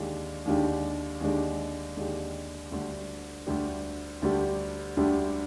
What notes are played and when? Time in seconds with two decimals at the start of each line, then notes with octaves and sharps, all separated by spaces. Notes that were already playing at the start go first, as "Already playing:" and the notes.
Already playing: D#2 D3 G#3 D4 G4
0.46 D#2 D3 G#3 D4 G4
1.21 D#2 D3 G#3 D4 G4
1.97 D#2 D3 G#3 D4 G4
2.72 D2 D3 G3 D4 G4
3.47 D2 D3 G3 D4 G4
4.22 D2 D3 G3 D4 G4
4.97 D2 D3 G3 D4 G4